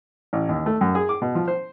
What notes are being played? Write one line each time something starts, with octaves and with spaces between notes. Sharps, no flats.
A1
D#2
A3
F#2
G#4
D6
B2
F3
C5